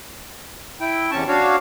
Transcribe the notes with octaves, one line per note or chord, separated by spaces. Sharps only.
E4 G5
E2 C3 C#4 A5 C#6
D4 F#4 C#5 F5